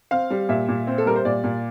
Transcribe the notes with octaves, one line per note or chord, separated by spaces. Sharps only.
C4 F5
G3
A#2 E5
A#2
C4
A4
G3 A#4
C5
A#2 D5
A#2